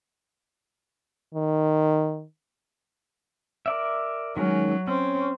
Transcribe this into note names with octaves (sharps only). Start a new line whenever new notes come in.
D#3
A#4 D5 E5
D#3 F#3 G#3 C#4
C4 C#4